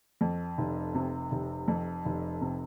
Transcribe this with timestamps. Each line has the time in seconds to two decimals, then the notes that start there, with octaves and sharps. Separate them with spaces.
0.21 F2
0.58 F1
0.95 C3
1.32 F1
1.68 F2
2.05 F1
2.41 C3